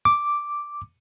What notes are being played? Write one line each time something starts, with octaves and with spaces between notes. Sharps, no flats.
D6